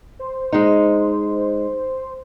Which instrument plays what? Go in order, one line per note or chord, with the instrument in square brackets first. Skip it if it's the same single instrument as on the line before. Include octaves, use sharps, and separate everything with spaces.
[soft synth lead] C5
[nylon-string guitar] G#3 D#4